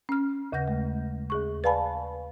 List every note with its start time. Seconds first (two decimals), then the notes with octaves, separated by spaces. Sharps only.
0.09 C#4 F6
0.52 D#2 C#3 F#5 G6 A#6
0.68 G#3 A3
1.30 D#2 G#4 C#6
1.64 B4 D5 F5 G#5 A5 B5